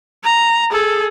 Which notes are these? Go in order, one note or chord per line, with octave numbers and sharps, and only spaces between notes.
A#5
G#4 A4